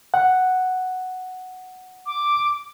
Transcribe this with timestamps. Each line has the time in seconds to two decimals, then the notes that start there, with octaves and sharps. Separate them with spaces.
0.14 F#5
2.06 D6